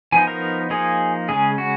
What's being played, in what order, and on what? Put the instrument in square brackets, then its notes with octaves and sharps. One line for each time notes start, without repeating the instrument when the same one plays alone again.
[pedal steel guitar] F3 B3 D#4 G#5
A#4
F3 A#3 D#4 G#4
C#3 G#3 C#4 G#4
F#4